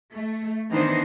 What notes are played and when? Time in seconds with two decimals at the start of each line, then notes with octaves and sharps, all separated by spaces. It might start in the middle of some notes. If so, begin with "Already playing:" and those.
0.14 A3
0.70 D#3 E3 B3 D4 C5 D#5